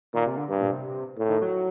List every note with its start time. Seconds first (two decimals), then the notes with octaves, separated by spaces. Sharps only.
0.14 A#2 D#3
0.26 C3
0.37 D3
0.49 G2
0.61 A#2
0.72 C3
1.18 A2
1.29 D#3
1.42 F#3